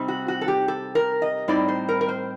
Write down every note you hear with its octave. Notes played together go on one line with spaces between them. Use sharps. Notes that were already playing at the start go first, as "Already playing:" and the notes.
Already playing: C3 G3 C4 D#4
F#4
F#4
A4
G4
A4
A#4
D#5
A2 G3 C4 D#4 D5
C5
A#4
A#4
C5